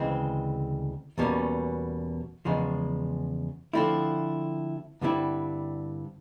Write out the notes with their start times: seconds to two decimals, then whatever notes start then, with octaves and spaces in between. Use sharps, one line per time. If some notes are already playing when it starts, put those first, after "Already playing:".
Already playing: D2 C#3 E3 G#3 C4
1.18 E2 B2 G3 A#3 C#4
2.45 E2 C#3 F3 G#3
3.73 D3 F3 A3 C4 E4
5.01 G2 D3 G3 C4 E4